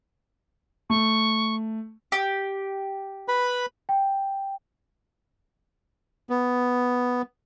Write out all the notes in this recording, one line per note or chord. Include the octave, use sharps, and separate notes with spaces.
A3 C#6
G4
B4 B5
G5
B3